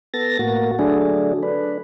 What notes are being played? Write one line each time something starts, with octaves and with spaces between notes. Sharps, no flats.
B3 A4 A6 A#6
A2 A#3 F#4
D3 F#3 A3 D4 G#4
D4 B4